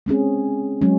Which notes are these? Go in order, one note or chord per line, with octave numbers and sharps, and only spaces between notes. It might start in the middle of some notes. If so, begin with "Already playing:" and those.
G#3 C4 C#4 G#4
F#3 G#3 C#4